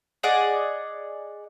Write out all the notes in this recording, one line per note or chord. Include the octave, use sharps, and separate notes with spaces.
G#4 D5 D#5 F#5